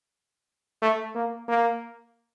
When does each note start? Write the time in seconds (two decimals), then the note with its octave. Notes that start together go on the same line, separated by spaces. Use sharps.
0.82 A3
1.15 A#3
1.48 A#3